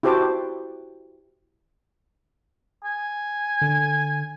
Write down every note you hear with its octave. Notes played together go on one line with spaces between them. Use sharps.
E4 F#4 G4 C5 A5 D6
G#5
D3